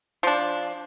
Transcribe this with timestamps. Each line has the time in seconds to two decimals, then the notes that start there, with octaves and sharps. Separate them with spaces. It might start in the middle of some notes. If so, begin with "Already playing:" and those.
0.23 F3 D4